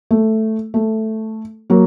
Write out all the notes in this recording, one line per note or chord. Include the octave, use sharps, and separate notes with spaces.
A3
A3
F#3 A#3